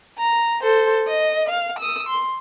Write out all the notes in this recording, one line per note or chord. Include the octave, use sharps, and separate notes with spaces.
A#5
A4 C5
D#5
F5
D#6 E6
C6